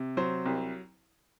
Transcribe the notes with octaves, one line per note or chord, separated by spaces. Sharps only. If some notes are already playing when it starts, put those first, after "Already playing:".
Already playing: C3
F#3 C5
C2